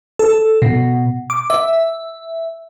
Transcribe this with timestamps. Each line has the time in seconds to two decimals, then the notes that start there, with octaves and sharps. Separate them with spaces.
0.19 A4
0.62 B2
1.30 D6
1.50 E5